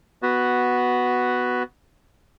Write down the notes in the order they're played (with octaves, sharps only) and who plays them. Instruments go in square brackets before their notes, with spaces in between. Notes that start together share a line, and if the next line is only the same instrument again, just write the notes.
[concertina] B3 F#4